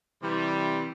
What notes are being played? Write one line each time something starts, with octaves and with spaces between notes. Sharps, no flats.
C3 E3 G3